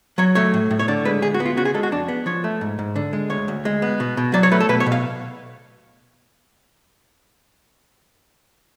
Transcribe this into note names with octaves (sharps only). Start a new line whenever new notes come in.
F#3 C#5
A3 C#5
A2
A2
C#5
D3 D5
G#3 B4
D2 G#4
F#4
B3
F4
C#3 F#4
G#4
G#3 A4
F#4
F2 D4
B3
F3 C#5
A3
G#2
G#2
D3
G#3
D2 C#5
D2
G#3
B3
B2
B2
F#3 D5
C#5
A3 B4
A4
B2 B4
C#5
B2
F5